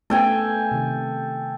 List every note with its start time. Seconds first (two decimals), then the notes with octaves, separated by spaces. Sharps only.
0.10 A3 B3 C#4 A4 G5 G#5
0.71 C3 D#3